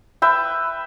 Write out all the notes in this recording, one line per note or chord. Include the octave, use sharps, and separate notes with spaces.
B4 E5 G5